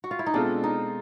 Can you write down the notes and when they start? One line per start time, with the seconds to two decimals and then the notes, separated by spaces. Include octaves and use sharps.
0.04 F#4
0.11 F4
0.19 E4
0.26 D#4
0.34 B2 G#3 C4 D4 F4 A4
0.64 D#4